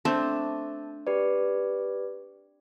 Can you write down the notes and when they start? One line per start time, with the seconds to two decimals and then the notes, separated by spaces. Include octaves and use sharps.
0.05 A3 C4 D4 A5
1.07 G4 B4 D5